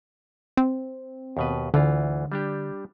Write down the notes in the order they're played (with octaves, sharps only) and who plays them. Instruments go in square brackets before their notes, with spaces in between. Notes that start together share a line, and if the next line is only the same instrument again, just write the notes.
[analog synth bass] C4
[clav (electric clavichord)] D#2 B2 B4
[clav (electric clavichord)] D2 E3 F4 [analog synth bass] D3
[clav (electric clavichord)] G3 D4 G4